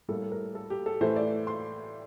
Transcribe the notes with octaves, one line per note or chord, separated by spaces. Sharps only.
A2 G3 A#3 A4
A#4
A4
G4
A4
A2 E3 A3 C5
D5
C6